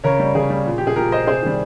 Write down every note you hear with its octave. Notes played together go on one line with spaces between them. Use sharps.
C#3 A#4 C#5
G3
C#3 G#4
G3
A#2
F3 G4
G#4
A#2 G4 A#4
F3 C5 D#5
C3 G#4 C5
D#3 G3